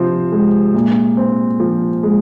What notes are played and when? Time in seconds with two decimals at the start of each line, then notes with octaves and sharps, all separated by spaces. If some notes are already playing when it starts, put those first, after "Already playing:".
Already playing: C3 F3 C4
0.32 G#3
0.74 A#2
1.17 C4
1.60 F3
2.03 G#3